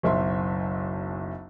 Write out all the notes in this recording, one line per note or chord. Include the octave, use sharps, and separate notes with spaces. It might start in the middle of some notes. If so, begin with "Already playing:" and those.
F#1 B1 E5 C6